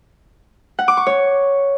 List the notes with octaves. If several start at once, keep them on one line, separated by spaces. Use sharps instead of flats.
F#5
D6
C#6
C#5